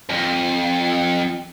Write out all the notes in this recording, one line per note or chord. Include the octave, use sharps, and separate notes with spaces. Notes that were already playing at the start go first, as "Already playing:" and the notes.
F2